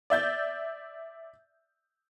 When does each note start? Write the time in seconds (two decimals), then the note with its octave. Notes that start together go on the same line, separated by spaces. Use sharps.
0.10 D5 E5 G6 A6